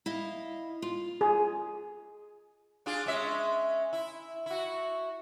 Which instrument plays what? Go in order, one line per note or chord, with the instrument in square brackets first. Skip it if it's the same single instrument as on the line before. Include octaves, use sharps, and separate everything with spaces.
[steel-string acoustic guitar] E4 D#5 F5
F4
[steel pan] G#4
[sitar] D4 F4 G#4
G#3 C#4 E5
E4
E4 F#4